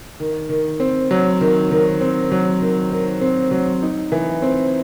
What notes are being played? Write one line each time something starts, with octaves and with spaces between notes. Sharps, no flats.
D#3
D#3
C4
F#3
D#3
D#3
C4
F#3
D#3
D#3
C4
F#3
D#4
E3
C4